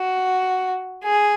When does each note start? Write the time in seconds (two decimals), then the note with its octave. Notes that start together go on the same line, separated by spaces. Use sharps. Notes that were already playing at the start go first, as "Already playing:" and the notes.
Already playing: F#4
1.04 G#4